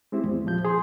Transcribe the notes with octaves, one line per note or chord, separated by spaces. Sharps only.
G#3 C4 E4 G4
E2
A#2 F3 G6
G#4 C6